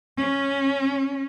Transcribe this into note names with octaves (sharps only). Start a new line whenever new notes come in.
C#4